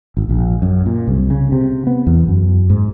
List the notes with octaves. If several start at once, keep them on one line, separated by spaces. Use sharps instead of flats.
G#1
A#1
F#2
A#2
C2
C#3
C3
B3
E2
F#2
G#2